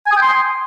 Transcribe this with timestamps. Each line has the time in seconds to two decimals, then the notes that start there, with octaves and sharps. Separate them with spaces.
0.06 G#5
0.11 D#6
0.16 G5
0.22 C6